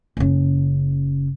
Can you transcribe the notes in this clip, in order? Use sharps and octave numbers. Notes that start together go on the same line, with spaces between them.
F#1 C#3